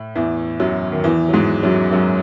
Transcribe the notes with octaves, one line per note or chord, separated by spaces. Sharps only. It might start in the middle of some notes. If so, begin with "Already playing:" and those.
Already playing: A2
E2 E3
F#2 F#3
D#3
E2 E3
F#3
G#2 G#3
F#2 F#3
F#2 F#3